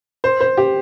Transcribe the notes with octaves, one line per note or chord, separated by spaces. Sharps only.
C5
C5
G4